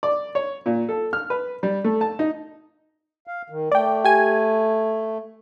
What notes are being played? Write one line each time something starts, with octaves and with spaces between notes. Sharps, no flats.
D5
C#5
A#2
A4
F6
B4
G3
A3
A5
D#4
F5
D#3
A3 D5 G5
G4 G#5